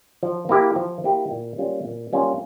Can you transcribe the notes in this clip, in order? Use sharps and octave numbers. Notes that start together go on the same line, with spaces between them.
F3
A#3 E4 G4
F3
A#3 E4 G4
A#2
G3 A#3 C#4 F4
A#2
G3 A#3 C#4 F4